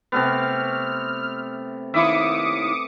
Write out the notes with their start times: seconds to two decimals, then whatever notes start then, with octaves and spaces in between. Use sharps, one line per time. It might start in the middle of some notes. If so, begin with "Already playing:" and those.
0.12 C3 A3 B3 F6
1.94 D#2 E4 E5 D6 D#6 C#7